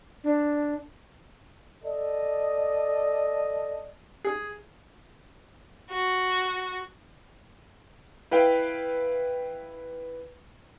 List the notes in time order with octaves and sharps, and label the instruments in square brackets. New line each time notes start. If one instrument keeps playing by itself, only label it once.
[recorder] D4
[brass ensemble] A4 D5 D#5
[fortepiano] G#4
[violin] F#4
[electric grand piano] E4 B4 F5 G5